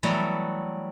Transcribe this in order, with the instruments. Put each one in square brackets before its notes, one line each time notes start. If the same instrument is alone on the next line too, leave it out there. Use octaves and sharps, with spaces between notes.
[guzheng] E3 F#3 G3 A3 B3